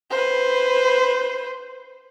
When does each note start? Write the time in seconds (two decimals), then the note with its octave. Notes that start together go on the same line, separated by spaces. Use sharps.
0.10 B4 C5